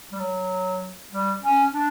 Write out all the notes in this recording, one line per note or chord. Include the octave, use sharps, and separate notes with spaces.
G3
F#3
G3
C#4
D4